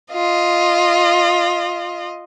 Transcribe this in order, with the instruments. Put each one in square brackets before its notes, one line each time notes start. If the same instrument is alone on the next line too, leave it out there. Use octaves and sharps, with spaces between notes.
[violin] F4 D#5